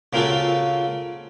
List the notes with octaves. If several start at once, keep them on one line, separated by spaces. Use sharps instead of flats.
C#3 A#3 C4 F4 F#4 A4